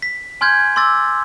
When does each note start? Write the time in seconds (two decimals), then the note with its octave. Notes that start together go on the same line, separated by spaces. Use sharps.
0.02 B6
0.41 G#5 C6 F6 G6 G#6
0.76 C6 D6 E6 A6